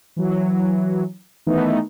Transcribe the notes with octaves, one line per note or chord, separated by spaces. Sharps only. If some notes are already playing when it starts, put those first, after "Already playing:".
E3 F#3
D#3 E3 A3 B3 D#4